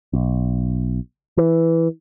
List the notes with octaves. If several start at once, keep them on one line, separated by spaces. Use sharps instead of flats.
B1
E3